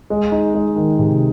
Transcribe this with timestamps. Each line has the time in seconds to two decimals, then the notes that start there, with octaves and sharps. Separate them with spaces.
0.10 G#3
0.32 D#4
0.55 G#3
0.76 D#3
0.99 C3